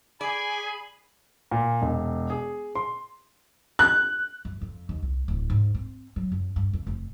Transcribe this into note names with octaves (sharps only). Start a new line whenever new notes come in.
G#4 D5 G#5 B5
A#2
E1
G#4
C6
F#6
F#2
F2
D#2
C2
D1
G#2
C4
F#3
F#2
G2
F2
F1